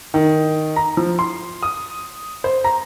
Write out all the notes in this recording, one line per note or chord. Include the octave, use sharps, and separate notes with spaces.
D#3
A#5
F3
C6
D#6
C5
A#5